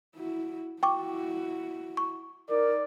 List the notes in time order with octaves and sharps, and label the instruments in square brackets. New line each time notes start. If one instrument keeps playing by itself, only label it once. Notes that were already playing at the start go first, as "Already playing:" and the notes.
[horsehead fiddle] E4 F#4
[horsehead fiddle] E4 F#4 [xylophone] G5 C#6 D6
[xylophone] C#6
[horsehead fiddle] D#4 [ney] A#4 [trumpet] D5